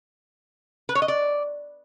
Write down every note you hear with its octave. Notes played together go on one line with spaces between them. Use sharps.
B4
C#5
D#5
D5